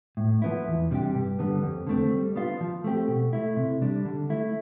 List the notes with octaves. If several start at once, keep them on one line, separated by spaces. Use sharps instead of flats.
A2
F3 B3 E4
E2
C3 G3 D4 G4
G2
D3 G3 B3
F2
D3 A3 C4
G3
B3 D4 F4
F3
A3 C4 G4
B2
A3 E4
C3
G3 D4
D3
A3 E4